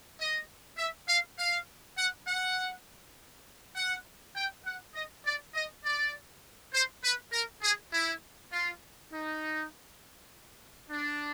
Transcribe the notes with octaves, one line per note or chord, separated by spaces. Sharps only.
D#5
E5
F5
F5
F#5
F#5
F#5
G5
F#5
D#5
D5
D#5
D5
C5
B4
A#4
G#4
E4
F4
D#4
D4